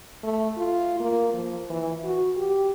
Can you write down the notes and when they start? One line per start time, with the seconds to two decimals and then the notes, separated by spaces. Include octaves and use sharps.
0.23 A3
0.58 F4
1.00 A#3
1.34 F3
1.70 E3
2.05 F#4
2.37 G4